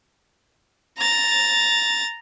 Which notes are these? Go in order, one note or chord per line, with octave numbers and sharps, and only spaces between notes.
A#5 A6